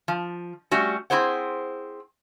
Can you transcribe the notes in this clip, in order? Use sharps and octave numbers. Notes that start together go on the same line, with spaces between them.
F3
G3 A3 C#4 F#4
C4 E4 G#4 C5 F#5